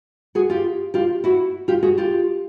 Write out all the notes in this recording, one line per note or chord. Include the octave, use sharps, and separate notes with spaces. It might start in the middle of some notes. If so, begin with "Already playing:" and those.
F#4 G#4
F4 G4
F4 G4
E4 F#4
F4 G4
F#4 G#4
F4 G4